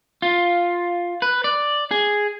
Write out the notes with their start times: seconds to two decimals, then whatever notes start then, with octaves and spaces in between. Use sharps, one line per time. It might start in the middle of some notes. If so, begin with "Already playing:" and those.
0.22 F4
1.22 B4
1.44 D5
1.91 G#4